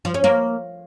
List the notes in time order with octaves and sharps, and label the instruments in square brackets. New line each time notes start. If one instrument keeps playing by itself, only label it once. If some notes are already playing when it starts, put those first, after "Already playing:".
[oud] F3
C#4
A#3